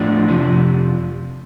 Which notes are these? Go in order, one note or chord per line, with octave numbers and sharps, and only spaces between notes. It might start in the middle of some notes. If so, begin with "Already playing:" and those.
Already playing: A2 F3 A3 D4
F2 C3 F3